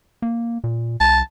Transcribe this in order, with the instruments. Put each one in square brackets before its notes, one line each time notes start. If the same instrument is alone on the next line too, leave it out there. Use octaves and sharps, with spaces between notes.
[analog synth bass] A#3
A#2
[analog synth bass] C2 [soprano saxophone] A5